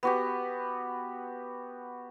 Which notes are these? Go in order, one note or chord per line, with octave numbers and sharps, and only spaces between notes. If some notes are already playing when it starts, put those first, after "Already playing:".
B3 F#4 G4